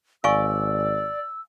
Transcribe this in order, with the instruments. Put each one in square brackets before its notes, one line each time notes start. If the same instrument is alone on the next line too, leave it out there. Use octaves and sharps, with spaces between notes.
[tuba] G#1 [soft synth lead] D5 [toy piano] F5 G#5 C#6 [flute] E6